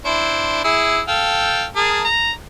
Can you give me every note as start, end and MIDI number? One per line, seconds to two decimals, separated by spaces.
0.05 0.61 62
0.05 0.61 64
0.05 0.61 72
0.65 1.01 64
0.65 1.01 68
0.65 1.01 88
1.08 1.66 69
1.08 1.66 77
1.08 1.66 79
1.76 2.05 68
1.76 2.05 70
1.76 2.05 81
2.05 2.31 82